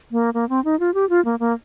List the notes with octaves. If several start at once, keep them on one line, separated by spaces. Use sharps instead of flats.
A#3
A#3
C4
D#4
F4
G4
F4
A#3
A#3